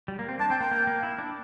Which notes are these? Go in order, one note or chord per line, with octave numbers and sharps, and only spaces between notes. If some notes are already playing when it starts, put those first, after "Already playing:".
G3
A#3
C4
D4 A5
C4 G5
A#3 G5
A#3
A#3
E4
D4